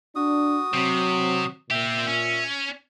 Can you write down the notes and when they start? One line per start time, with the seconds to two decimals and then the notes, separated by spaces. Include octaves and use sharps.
0.16 D4 F#4 D#6
0.74 C3 F#3 C4
1.71 A#2 C4 G4 E5
2.08 C#4